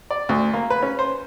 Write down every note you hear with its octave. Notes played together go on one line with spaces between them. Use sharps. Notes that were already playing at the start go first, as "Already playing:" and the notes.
D5
D2
A#3
B4
C#4
C5